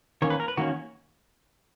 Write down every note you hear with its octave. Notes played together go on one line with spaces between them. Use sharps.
D#3 A#3 C#4 C#5
B4
A#4
B4
D#3 A#3 C#4 F#4